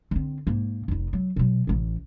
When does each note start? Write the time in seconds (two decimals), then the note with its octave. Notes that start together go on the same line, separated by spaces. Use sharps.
0.11 D3 C4
0.47 G#2 A#3
0.88 F1 D#4
1.13 F#3
1.36 B2 F#3
1.67 A1 E3